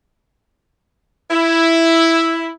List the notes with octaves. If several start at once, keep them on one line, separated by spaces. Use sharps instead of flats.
E4